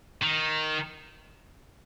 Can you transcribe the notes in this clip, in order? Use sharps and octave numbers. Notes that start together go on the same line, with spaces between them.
D#3